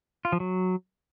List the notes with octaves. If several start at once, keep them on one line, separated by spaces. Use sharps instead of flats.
F4
F3
F#3